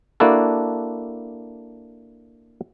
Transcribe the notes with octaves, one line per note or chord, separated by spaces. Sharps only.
A#3 D4 E4 F#4 A4